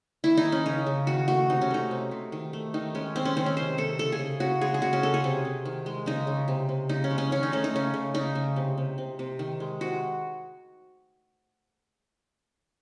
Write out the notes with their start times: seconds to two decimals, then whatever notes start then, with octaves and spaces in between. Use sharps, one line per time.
0.24 D#3 E4
0.37 D#4
0.45 D#3
0.52 C#4
0.66 C#3 D#4
0.86 C#3
1.07 D#3 F#4
1.28 A3 F#4
1.50 C3 D#4
1.61 C#4
1.71 A3 D#4
1.91 C3
2.11 C3
2.32 D#3
2.53 A3
2.74 D#3 D#4
2.95 G#3 C#4
3.16 D#3 C4
3.25 C#4
3.37 D#3 C4
3.46 C#4
3.57 C3 C5
3.78 C3 A4
3.98 C#3 A4
4.12 G#4
4.19 C#3
4.40 C#3 F#4
4.61 G#3 G#4
4.74 G#4
4.82 C#3 F#4
4.93 C#4
5.03 C#3 A4
5.14 G#4
5.24 C3
5.45 C3
5.65 D#3
5.86 G#3
6.06 C#3 D#4
6.27 C#3
6.48 C3
6.69 C3
6.89 C#3 D#4
7.04 C#4
7.11 G#3
7.18 C#4
7.31 D#3 C#4
7.43 D#4
7.52 A3 C#4
7.64 D#4
7.74 C#3 C#4
7.94 C#3
8.14 C#3 D#4
8.35 C#3
8.56 C3
8.78 C3
8.98 C3
9.19 C3
9.39 D#3
9.60 G#3
9.81 C3 F#4